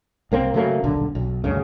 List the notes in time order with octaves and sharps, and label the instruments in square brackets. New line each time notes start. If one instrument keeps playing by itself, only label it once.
[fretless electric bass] C2 A#3 C4
C#3 F#3 A3 A#3
D#1 B1 D3
B1
D2 G2 C#3